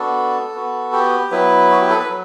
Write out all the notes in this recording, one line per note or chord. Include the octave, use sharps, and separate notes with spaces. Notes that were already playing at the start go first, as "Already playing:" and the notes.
Already playing: B3 D4 F#4 A4
B3 F#4
G4
F#3 B3 E4 B4
F#4
G4
A4
B4
F#3